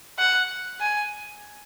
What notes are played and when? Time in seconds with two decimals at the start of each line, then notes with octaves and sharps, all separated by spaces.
0.19 F#5
0.80 G#5